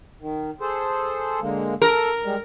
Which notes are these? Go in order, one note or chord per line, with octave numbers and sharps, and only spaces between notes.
D#3
G#4 A4 C5
D3 G#3 A#3
A4 A#4
G3 G#3